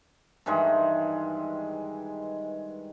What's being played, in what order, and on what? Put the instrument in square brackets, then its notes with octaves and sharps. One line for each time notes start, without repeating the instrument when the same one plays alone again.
[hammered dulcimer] G2 D#3 E3 G#3